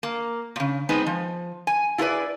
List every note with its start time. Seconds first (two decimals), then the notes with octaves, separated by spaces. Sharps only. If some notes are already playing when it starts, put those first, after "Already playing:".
0.03 A#3
0.56 A#2 C#3
0.89 G#3 B3 C4 D#4 B4
1.06 F3
1.67 G#5
1.98 E4 F4 G#4 A#4 B4 D5